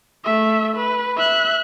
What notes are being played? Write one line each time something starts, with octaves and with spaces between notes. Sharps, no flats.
A3 E5
B4
E5 F#6